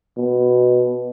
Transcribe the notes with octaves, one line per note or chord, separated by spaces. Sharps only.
B2